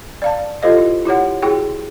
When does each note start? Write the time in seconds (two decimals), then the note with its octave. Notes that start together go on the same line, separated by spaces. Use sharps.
0.22 D5 F5 A5
0.62 F4 G4 A4 C5 D#5 F5
0.78 E4
1.05 E4 G4 C#5 F#5
1.42 E4 F#4 G#4 G5